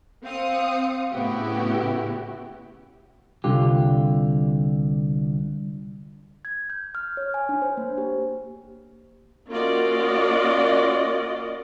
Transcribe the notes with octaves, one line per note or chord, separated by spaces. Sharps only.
C4 F5 D#6 C#7
A2 C#3 B3 E4 F#4 G4
C2 D3 F4 G4
G#6
G6
F6
C#5
G#5
D4
C5
A#3
G4
A#3 C#4 F4 F#4 D5 D#5